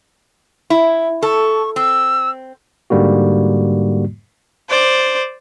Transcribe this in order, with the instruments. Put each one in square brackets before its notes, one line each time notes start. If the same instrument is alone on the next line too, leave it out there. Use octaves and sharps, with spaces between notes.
[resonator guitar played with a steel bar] E4
[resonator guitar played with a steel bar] A4 [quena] C#6
[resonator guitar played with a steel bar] C4 [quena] E6
[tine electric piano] G#2 D3 G3 A#3 F#4
[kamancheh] C5 D5